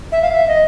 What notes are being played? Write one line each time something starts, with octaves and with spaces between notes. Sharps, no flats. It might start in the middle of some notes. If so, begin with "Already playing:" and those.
E5
F5
E5
D#5